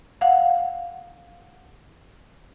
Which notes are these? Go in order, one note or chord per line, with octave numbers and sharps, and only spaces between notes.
F5 F#5